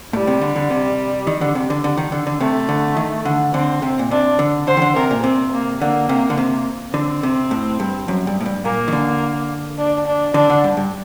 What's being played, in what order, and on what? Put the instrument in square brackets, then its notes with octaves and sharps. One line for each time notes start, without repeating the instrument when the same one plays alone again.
[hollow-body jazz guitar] A2 [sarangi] G3
[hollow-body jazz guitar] C3
D3
D3
C3
D#3
D3
C3
D3
D3
D#3
D3
D3
[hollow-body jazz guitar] C3 [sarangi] A3
[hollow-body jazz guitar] D3
D#3
D3
[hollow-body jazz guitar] D3 [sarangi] C4
[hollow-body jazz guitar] C3
A#2
[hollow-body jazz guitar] C3 [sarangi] D4
[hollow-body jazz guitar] D3
[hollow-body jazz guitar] D3 [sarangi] C5
[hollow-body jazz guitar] D#3
D3
[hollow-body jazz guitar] C3 [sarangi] A#4
[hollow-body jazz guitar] A#2
[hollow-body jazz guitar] C3 [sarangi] C4
[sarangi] A#3
[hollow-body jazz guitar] D3 [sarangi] A#3
[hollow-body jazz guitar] C3
D3
C3
[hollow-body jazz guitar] D3 [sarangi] C4
[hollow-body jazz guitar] C3
A2
G2
F#2
G2
A2
G2
[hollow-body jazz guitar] A#2 [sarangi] A#3
[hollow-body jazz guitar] D#3
D3
[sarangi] D4
D4
[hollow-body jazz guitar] D3 [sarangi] D4
[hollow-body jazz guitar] D3
G2
G2